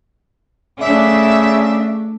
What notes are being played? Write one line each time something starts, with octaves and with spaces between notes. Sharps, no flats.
C#3 A3 D4 E5